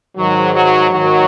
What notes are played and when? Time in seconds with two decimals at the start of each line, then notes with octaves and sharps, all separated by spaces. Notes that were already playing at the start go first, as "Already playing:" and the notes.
0.16 G#2 D#3 F#3
0.54 F#3
0.91 G#2 D#3 F#3